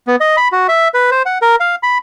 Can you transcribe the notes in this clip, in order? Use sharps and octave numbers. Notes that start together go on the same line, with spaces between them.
B3
D#5
B5
F#4
E5
B4
C5
F#5
A#4
F5
B5